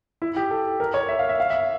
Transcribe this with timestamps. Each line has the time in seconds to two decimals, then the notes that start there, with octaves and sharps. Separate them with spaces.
0.22 E4
0.36 G4
0.51 A4
0.80 A#4
0.94 C#5
1.09 E5
1.19 F5
1.29 E5
1.40 F5
1.50 E5